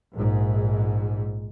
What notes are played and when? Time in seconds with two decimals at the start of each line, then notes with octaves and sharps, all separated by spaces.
0.14 A#1 G#2